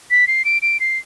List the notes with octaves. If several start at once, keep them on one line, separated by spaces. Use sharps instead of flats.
B6
C7
D7
D7
C7